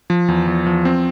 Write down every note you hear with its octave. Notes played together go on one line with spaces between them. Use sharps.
F3
E2
E2
F3
C4